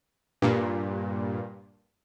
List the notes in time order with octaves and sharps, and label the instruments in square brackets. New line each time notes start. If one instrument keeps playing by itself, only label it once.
[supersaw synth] G2 A#2